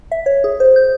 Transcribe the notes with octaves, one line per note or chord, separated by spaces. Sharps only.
E5
C#5
G#4
C5
G6